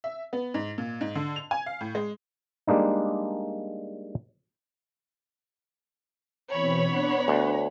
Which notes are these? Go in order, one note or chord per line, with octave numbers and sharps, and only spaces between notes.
E5
B3
G#2
A#2
G#2
D3
F7
G#5
F5
A2
G#3
G3 G#3 A#3 D4 D#4
B2 E3 C4 C#5 B5
B3 D4 F#5
D2